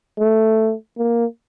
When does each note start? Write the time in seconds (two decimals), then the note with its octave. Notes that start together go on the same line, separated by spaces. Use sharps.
0.18 A3
0.97 A#3